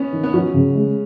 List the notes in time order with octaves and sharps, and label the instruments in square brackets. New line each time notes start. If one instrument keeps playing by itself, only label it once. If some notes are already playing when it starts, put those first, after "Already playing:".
Already playing: [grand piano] B3 C#4
[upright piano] D#3
[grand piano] B3
[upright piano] F#3 [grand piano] C#4
[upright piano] C#3
G#3